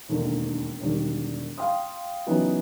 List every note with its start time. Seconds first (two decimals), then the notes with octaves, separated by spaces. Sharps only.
0.08 E1 D#2 D3 D#4
0.80 E1 D#3 G3
1.58 F5 G5 C6 D#6
2.26 C#3 E3 F#3 B3 D#4